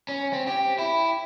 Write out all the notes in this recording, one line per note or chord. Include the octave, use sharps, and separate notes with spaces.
C#4
C4
G4
E4